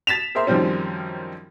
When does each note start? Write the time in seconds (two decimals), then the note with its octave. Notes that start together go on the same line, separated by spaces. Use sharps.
0.07 A6 B6 E7 F7
0.35 G#4 A#4 C5 E5 C6
0.47 F#2 D#3 F3 G3 C4 C#4